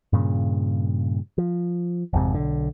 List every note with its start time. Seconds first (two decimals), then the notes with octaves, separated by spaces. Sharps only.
0.13 G2 A#2 C#3
1.38 F3
2.13 G#1 F2 G#2 C3
2.34 B1 D3